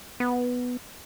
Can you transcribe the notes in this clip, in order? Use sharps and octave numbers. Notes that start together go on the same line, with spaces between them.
B3